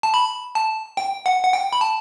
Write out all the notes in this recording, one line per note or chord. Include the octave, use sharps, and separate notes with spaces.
A5
B5
A5
G5
F#5
F#5
G5
B5
A5